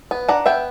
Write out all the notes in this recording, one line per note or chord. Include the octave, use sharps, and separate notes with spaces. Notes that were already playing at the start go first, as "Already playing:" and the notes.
B3
D4 F#5 A#5
B3 E5 G5